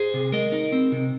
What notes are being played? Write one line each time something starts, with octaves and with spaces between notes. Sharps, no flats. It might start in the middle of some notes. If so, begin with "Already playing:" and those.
Already playing: G#4 C5
C3
G#3 A#4 D#5
D#4
C4
C3